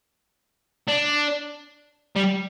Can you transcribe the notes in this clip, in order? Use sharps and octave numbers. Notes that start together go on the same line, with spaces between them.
D4
G3